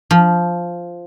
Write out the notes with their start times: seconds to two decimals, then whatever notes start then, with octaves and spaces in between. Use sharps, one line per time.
0.11 F3